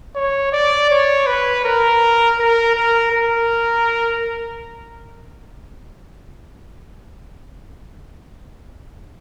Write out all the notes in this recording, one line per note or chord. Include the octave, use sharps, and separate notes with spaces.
C#5
D5
C#5
B4
A#4
A#4
A#4
A#4